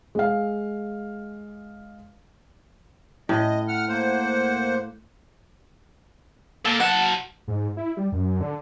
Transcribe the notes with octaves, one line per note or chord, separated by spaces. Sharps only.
G#3 F5
A2 D#5
F#5 F6
A#3 C5 F#5
A#2 A4
F#3 F#5 A5
G#2
E4
G3
F#2
D3